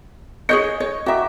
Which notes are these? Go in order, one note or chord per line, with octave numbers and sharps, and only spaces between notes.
G#4 C#5 D#5 C#6 G6 C#7
C#5 D#5
F#4 E5 G5 A#5 D6